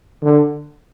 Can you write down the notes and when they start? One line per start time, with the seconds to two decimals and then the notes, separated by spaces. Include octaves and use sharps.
0.22 D3